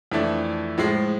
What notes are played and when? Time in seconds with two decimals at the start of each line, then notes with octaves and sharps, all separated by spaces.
0.12 F2 E3 A3 D4
0.78 A2 F3 G#3